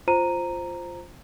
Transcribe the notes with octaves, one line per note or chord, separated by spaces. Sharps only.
F4 C5 A#5 D#7